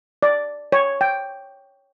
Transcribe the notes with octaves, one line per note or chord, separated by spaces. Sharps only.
D5
C#5
G5